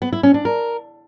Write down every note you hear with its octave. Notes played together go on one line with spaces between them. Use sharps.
B3
E4
C#4
D4
A#4